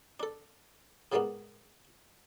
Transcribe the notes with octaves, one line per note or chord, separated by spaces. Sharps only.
D4 A4
A2 C#3 G3 G#3 A#3 B3